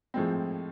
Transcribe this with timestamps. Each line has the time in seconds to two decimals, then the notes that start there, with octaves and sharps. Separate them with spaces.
0.14 A2 F3 G#3 C4